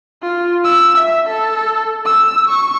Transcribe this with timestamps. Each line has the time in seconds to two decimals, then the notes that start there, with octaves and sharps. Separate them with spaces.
0.23 F4
0.64 E6
0.98 E5
1.29 A4
2.05 E6
2.48 C#6